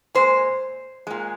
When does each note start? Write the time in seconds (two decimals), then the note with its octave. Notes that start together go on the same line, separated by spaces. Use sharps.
0.15 A#2 G#3 C5
1.07 A#2 G#3